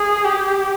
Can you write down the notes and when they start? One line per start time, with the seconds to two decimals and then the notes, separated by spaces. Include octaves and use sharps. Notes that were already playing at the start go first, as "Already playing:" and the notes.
Already playing: G#4
0.25 G4